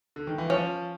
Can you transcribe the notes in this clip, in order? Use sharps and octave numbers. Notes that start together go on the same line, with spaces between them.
D3
D#3
E3
F3 C#4